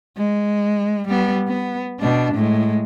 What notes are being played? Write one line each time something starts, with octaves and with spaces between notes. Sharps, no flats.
G#3
G3 B3
B3
B2 D4
A2 G#3